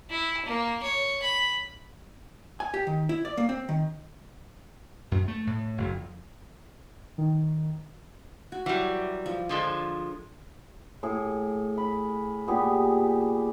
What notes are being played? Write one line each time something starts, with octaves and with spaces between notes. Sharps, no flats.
E4
A#3
C#5
B5
G#5
G4
D#3
E4
D5
A#3
C4
D#3
F#2
A3
A2
F#1
F2
D#3
F#4
E3 F#3 G3
F3
D3 F3 G#3 D#5
A2 G#4
B5
A#2 B3 G4 G#4